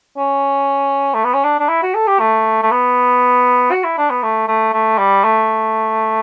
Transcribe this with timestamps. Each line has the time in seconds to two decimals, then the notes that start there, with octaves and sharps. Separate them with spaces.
0.18 C#4
1.14 A3
1.24 B3
1.34 C#4
1.44 D4
1.60 D4
1.69 E4
1.83 F#4
1.95 A4
2.07 G4
2.20 A3
2.63 A3
2.71 B3
3.72 F#4
3.84 E4
3.98 D4
4.10 B3
4.23 A3
4.48 A3
4.73 A3
4.98 G3
5.24 A3